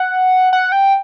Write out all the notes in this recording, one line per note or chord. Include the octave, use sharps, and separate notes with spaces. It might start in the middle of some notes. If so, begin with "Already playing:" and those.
Already playing: F#5
F#5
G5